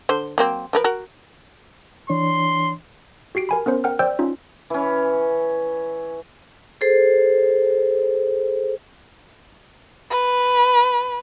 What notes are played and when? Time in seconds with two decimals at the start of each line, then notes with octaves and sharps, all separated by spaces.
0.09 D3 C5
0.38 F#3 A#3 C4
0.73 F3 A#4 B4
0.84 F#4 A#4
2.10 E3 D4 C#5 C6
3.35 F#4 G4 C7 D7
3.49 A#4 G#5 B5
3.66 B3 C#4 A#4 C5
3.84 A#4 F#5 G5 F6
3.99 C5 D5 G5 E6 G6
4.19 C#4 D#4 F4
4.70 E3 C#4
6.81 G#4 A4 C5
10.11 B4